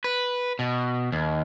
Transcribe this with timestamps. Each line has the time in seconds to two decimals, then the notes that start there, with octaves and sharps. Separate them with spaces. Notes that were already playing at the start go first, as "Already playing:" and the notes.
0.04 B4
0.59 B2
1.12 D#2